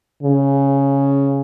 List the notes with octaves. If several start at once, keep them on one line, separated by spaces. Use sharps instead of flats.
C#3